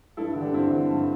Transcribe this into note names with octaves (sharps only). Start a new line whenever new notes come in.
G2 E4 A4
D3
D4 G4
G2 C4 E4
D3
G2